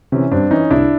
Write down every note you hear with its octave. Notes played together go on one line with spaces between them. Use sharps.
C3 E3 C#4
G2 C4 D4
E3 C#4 D#4
C2 D4 E4